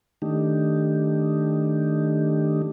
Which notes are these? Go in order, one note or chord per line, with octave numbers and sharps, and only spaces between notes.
D#3 A3 D4 D#4 G4